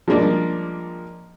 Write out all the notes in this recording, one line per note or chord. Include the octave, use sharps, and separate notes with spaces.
F3 G3 G#3 A#3 D4